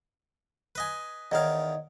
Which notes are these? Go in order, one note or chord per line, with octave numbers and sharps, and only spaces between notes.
B4 D#5 G#5
E2 D#3 D#4 C#5 D#5 F5